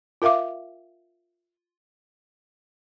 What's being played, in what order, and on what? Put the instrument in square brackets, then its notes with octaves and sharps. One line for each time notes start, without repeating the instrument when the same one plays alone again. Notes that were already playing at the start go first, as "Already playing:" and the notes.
[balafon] F4 A#4 E5 F5 D6